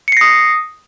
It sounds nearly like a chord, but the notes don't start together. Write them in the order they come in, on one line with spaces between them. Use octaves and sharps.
C#7 C7 A#6 D#6